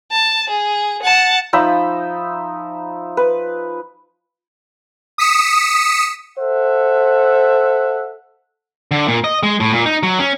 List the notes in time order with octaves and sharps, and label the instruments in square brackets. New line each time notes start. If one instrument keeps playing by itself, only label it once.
[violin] A5
G#4
F#5 A5
[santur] F3 D#4 E5 B5
B4
[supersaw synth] D#6 B6 C#7 E7
[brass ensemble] A4 C5 E5 F#5
[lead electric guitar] D3
A#2
D#5
G#3
A2
A#2
D#4
F#3
C#4